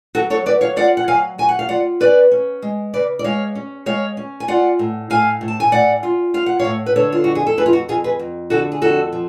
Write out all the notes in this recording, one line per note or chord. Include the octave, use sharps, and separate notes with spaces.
F#3 F#4 A4
A4 C#5
F#3 B4 D5
C#5 F5
F4 D5 F#5
F#5
F#3 F5 G#5
F#3 G#5
F#5
F5
F4 D5 F#5
C#4 B4 D5
C#4
G#3
C#3 B4 D5
D5
G#3 C#5 F5
C#4
G#3 C#5 F5
C#4
G#5
F4 D5 F#5
A2
A2 F5 G#5
A2
A5
G#5
A2 D5 F#5
F4
F4 F5
F#5
C#5 F5
A2
B4
D3 A4 C#5
F4
F2 F#4
G#4
A4
F2 G#4 B4
F4
F#4
F2 F4 G#4
G#4 B4
F2
D3 F#4 A4
G#4
F2 F#4 A4
F3